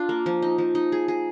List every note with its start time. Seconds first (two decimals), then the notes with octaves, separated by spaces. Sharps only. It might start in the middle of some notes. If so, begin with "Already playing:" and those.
Already playing: D4 F4
0.09 A#3
0.26 F3
0.42 D#4
0.58 F3
0.75 D#4
0.92 G#4
1.08 G#4